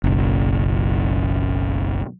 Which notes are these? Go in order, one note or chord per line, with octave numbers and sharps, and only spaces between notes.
F#1 B1